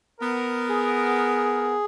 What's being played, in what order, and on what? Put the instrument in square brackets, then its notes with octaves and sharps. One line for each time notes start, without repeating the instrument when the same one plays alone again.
[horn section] B3 A#4
[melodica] G#4